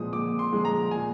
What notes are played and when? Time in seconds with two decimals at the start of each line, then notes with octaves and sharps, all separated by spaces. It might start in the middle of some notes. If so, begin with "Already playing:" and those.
Already playing: A#2 F3 G#3 D#6
0.12 A#2 D6
0.39 C6
0.52 F3 G#3
0.65 A#5
0.91 A#2 G#5